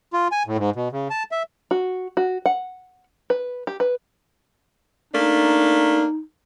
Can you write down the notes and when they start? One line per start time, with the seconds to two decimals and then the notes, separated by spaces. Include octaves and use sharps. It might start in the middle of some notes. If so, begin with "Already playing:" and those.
0.13 F4
0.32 G#5
0.47 A2
0.58 G#2
0.76 B2
0.92 C#3
1.10 A5
1.32 E5
1.71 F#4
2.17 F#4
2.46 F#5
3.30 B4
3.67 G4
3.80 B4
5.13 A3 A#3 D4 D#4